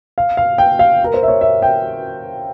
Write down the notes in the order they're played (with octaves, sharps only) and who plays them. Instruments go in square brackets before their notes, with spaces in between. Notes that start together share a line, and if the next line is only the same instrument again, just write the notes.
[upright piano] F5
F5
G5
F5
A#4
C5
E5
C#5
E5
G5